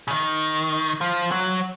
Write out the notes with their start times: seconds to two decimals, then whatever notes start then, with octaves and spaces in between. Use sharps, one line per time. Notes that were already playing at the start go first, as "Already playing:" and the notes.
0.08 C#3
0.11 D#3
1.01 F3
1.31 F#3